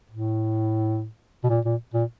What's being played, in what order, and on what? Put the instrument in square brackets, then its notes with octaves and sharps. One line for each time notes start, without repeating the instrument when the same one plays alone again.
[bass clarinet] A2
B2
A#2
A#2
A#2